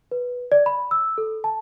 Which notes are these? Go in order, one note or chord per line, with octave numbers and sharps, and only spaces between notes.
B4
D5
B5
E6
A4
A5